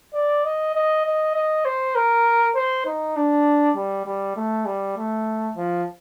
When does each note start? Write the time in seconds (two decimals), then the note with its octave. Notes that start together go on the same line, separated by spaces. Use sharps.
0.14 D5
0.44 D#5
0.75 D#5
1.05 D#5
1.35 D#5
1.65 C5
1.95 A#4
2.55 C5
2.86 D#4
3.16 D4
3.75 G3
4.05 G3
4.36 A3
4.66 G3
4.97 A3
5.56 F3